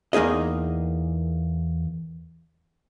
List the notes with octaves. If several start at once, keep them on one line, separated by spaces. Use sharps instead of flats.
E2 A#3 D#4 G#4 D#5